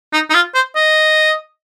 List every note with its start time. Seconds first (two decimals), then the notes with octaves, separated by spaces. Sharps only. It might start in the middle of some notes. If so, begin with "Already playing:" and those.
0.13 D#4
0.30 D#4
0.34 F4
0.55 C5
0.76 D#5